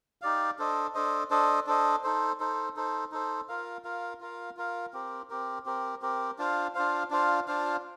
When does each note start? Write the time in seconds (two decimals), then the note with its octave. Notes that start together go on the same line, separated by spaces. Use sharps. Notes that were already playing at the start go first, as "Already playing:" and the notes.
0.22 D#4 G4 D5 F5
0.59 D4 A4 C5 D#5
0.95 D4 A4 C5 D#5
1.30 D4 A4 C5 D#5
1.67 D4 A4 C5 D#5
2.04 D#4 A4 C5
2.40 D#4 A4 C5
2.76 D#4 A4 C5
3.12 D#4 A4 C5
3.49 F4 A#4 F5
3.84 F4 A#4 F5
4.21 F4 A#4 F5
4.57 F4 A#4 F5
4.93 C4 G4 A#4
5.30 C4 G4 A#4
5.66 C4 G4 A#4
6.02 C4 G4 A#4
6.39 D4 F4 C5 F5
6.75 D4 F4 C5 F5
7.11 D4 F4 C5 F5
7.47 D4 F4 C5 F5